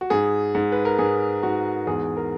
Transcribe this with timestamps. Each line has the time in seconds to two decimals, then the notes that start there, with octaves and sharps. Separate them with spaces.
0.01 F#4
0.10 G#2 G#4
0.55 G#2
0.72 B4
0.85 A#4
0.99 G#2 G#4
1.43 G#2 F#4
1.87 E2 G#4
2.17 A#4